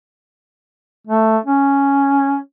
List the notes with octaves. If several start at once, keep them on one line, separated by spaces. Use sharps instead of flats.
A3
C#4